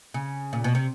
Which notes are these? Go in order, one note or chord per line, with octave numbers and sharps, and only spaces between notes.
C#3
A#2
B2
C3